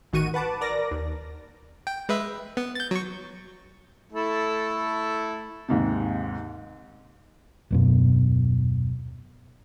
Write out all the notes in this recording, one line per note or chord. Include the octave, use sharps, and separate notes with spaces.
A1 D#3 F#4 C#6 D#7
B4 F#5 A5 D6
A#4 D5 A#6
D#2
G5
G#3 B4 E5
B3
G6 A6
F#3 C#6
A3 E4 A4
D#2 G#2 C3
D#1 F#2 B2